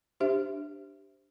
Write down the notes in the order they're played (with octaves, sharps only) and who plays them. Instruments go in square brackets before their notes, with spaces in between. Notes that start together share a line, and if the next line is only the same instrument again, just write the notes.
[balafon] D4 G4 C5 E5